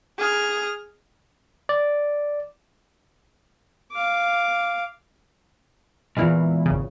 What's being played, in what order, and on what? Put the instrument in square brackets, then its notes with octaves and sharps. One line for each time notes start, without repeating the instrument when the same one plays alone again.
[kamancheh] G#4 F6
[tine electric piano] D5
[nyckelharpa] F5 D6
[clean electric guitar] B1 E2 [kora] A#2 E3 F5 [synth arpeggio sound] G#3 E4
[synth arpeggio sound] G#1 C#3